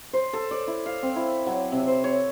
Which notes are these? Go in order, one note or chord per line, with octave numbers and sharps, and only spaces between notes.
C5
A4
D5
E4
F5
C4
E4
F#3
C3
C5
C#5